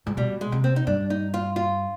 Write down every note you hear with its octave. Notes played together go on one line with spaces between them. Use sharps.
G#2
B2 G3
G#3
C3
C4
D#4
G2 D4
D#4
F4
F4